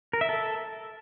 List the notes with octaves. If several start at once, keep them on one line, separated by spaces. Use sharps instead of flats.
A#4
E5
A4